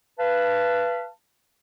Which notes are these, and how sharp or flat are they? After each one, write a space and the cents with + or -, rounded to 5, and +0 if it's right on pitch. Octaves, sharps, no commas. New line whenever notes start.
B4 +0 F5 -35 A5 +0